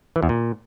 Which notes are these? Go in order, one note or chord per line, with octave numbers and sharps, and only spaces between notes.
E3
E2
A#2